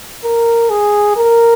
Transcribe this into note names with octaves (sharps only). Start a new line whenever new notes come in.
A#4
G#4
A#4